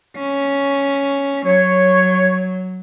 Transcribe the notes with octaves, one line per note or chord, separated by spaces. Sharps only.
C#4
F#3 C#5